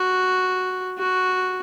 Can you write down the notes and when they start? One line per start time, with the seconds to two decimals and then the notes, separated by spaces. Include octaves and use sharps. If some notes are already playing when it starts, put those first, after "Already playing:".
Already playing: F#4
0.98 F#4